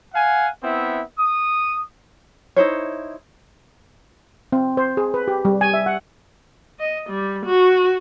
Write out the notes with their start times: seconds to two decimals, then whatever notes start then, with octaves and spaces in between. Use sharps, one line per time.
0.14 F5 F#5 G#5
0.63 B3 C4 E4 E5
1.18 D#6
2.56 D#4 E4 C5 C#5
4.52 C4
4.77 C5
4.97 G#4
5.14 B4
5.28 G4
5.45 G3
5.61 G#5
5.74 E5
5.86 F#5
6.79 D#5
7.09 G3
7.45 F#4